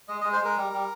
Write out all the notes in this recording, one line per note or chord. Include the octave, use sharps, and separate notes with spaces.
G#3 D#5
G#3 D#5
C5
G#3 A#4
G3
G3